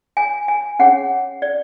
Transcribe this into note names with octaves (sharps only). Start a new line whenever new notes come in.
G#5
G#5
C#4 G#4 C#5 F#5
D5